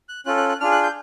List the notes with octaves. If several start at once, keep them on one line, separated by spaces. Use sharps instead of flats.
F#6
C#4 F4 A4 F#6
F#6
F#6
D4 F4 G#4 F6
F#6
G6